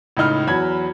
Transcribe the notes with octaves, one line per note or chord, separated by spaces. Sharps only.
C#2 A2 D#4 F6
E2 F#3 B5 G#6